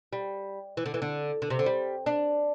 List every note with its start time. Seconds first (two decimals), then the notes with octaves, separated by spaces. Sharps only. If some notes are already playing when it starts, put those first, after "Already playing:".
0.13 G3
0.77 E3
0.86 D3
0.94 E3
1.02 D3
1.42 D3
1.50 C3
1.59 D3
1.66 G3
2.06 D4